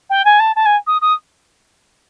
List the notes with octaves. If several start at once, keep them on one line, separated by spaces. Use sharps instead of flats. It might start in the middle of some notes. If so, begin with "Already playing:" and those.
G5
G#5
A5
A5
G#5
D#6
D#6